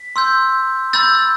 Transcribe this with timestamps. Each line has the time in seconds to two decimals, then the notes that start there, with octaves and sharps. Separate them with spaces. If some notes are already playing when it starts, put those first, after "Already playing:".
Already playing: B6
0.16 C6 E6 G6
0.93 B5 E6 G6 A6